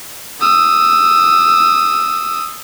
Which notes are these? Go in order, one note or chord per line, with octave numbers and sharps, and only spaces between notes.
D#6 E6